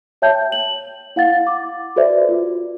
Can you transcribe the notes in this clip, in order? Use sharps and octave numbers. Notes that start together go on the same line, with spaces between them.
C#5 E5 G5 A5 G6
F#7
E4 F5 F#5 A6
D6
F#4 A4 B4 C5 D5 E5
F4